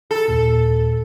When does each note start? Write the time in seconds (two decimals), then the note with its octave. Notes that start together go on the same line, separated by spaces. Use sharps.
0.11 A4
0.28 D#2 A#2